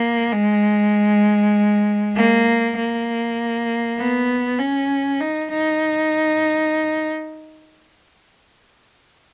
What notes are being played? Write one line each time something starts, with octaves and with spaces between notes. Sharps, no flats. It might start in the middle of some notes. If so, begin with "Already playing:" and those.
Already playing: A#3
G#3
A#3
A#3
B3
C#4
D#4
D#4